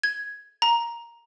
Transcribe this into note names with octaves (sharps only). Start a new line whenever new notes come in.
G#6
A#5